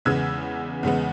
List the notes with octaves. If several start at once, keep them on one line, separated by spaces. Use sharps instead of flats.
E2 C#3 G#3 B3 E6 G#6
E2 C#3 G#3 B3